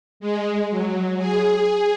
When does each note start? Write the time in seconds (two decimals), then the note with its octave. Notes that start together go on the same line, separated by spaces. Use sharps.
0.20 G#3
0.70 F#3
1.18 G#4